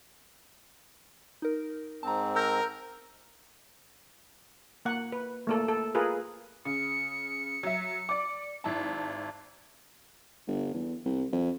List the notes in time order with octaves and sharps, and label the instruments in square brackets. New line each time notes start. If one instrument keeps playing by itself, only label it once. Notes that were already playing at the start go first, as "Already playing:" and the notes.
[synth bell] D#4 A#4
[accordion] G#2 C4 [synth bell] A5 A#5
[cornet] A#4 [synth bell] E6 G6 A#6
[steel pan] A#3 F#5
B4
A3 A#3 A4
A4
F4 G#4 A#4 B4
[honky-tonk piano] C#3 [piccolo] C#7
[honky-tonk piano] F#3 E5
D5 D6
G#1 E4 A5
[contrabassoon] G1
E2
C2
F2